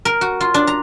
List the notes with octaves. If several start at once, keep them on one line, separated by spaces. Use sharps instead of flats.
A#4
F#4
F4
D4
A#5